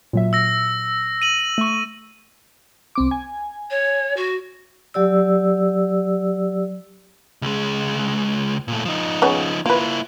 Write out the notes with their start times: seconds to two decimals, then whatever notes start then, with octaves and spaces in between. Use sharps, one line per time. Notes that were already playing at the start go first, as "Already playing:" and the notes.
0.13 A#2 F#3 E5
0.33 E6 A#6
1.22 D#7 F#7
1.58 A3 C#6
2.95 C2 C4 D6
3.11 G#5
3.70 C#5
4.16 F#4
4.94 F#3 G4 D5 E6
7.42 C#2 G#3
8.68 A#2 A3
8.85 F3 D#4
9.22 C#3 B3 C#5
9.66 A#3 E4 F4 B4